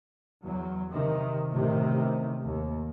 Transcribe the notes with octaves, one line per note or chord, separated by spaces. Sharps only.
E2 F#3
C3 D#3
A1 C3 D#3
D#2